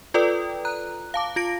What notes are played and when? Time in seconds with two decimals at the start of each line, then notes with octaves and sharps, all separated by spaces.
0.14 F4 A4 B4 D5 G5 D#6
0.65 A#5 F#6
1.14 F5 A5 D6
1.36 F4 A#6 D7